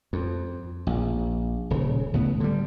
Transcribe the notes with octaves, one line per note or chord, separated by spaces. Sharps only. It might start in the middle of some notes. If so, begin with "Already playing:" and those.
F2
A#1
D#1 C#3
C#2 A2 B3
D3 G3